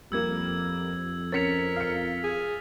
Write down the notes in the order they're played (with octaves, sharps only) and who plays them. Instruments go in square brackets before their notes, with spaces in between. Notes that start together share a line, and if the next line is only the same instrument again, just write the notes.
[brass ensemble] F2 [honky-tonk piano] G3 A#3 [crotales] E6 G#6
[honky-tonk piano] C#4 C#7 [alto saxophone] A#4 [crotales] A6 B6 F7
[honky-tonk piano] F5 C#7 [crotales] F6
[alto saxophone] G#4